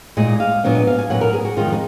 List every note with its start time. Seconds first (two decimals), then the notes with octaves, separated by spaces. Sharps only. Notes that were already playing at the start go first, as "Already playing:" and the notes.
0.17 A#2 G#3 D#4 D#5
0.40 F5
0.64 A#2 F#3 B3 D4
0.75 D#5
0.87 F5
0.98 G#5
1.10 A#2 F#3 B3 F#5
1.21 A#4
1.33 G#4
1.45 F#4
1.56 F2 D#3 G#3 F4
1.73 D#4